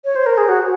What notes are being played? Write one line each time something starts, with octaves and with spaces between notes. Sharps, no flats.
C#5
C5
A#4
G#4
F#4